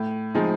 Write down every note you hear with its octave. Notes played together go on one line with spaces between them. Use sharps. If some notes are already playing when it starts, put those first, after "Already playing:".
Already playing: A2
F3 G#3 C4 D#4